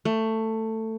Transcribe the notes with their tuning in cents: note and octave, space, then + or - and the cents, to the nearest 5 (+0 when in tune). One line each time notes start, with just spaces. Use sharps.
A3 +15